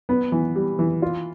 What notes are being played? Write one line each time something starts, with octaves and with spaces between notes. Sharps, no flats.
B3
E3
G3
E3
F4